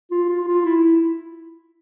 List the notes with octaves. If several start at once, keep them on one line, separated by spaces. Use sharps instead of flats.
F4
F4
F4
E4
E4